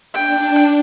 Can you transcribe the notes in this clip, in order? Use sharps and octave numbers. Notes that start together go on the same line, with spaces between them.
D4 G5